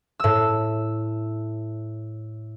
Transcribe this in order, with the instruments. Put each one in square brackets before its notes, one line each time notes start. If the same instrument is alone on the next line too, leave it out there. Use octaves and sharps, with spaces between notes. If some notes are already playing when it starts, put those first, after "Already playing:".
[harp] A2 E6